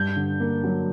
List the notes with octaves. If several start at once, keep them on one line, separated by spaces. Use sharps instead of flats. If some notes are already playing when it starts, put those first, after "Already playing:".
Already playing: G2 G6
D3
A#3
F#3